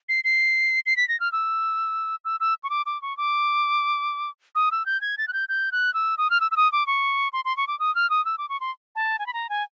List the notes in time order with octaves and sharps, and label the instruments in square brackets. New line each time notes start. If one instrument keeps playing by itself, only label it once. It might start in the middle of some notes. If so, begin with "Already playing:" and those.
[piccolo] C7
C7
C7
B6
A#6
F6
E6
E6
E6
C#6
D6
D6
C#6
D6
D#6
E6
G6
G#6
A6
F#6
G6
G6
F#6
E6
D#6
F6
E6
E6
D#6
D6
C#6
C6
C6
C#6
D6
D#6
F6
D#6
E6
D6
C#6
C6
A5
G#5
B5
A#5
G#5